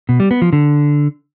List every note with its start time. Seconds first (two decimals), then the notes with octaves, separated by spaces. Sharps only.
0.09 B2
0.20 G3
0.31 B3
0.42 F3
0.53 D3